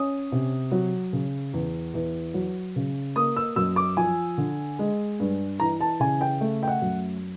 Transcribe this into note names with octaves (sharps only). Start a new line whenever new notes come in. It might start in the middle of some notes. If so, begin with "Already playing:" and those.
Already playing: C#4 D#6
C3
F#3
C#3
E2
E2
F#3
C#3
A#3 D#6
E6
F#2 E6
D6
F3 G#5
D3
G#3
G2
E3 A#5
A5
C#3 G#5
G5
A3
G5
F#5
F#2